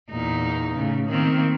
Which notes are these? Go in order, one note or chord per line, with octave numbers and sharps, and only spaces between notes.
E2 A#2 D#4
A2 C#3
D#3 A#3 C4